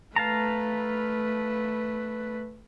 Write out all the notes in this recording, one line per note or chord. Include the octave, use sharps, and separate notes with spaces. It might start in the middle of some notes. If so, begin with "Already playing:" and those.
A3 B4 F5 A5 A#5